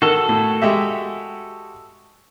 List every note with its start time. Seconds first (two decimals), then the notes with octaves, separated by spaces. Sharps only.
0.02 D#3 F#4 A4
0.29 A2
0.62 G#3 G4 E5